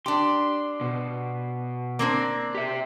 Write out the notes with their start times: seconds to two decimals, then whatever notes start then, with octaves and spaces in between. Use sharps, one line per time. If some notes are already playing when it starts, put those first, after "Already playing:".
0.06 D4 G4 C6
0.81 B2
1.99 A#3 C4 D4
2.55 G4 E5